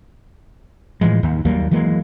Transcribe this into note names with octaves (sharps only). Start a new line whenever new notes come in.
A2 E3 F3 G#3
D#2
D#2 F#3 G3 A#3
E3 F#3 G#3 A#3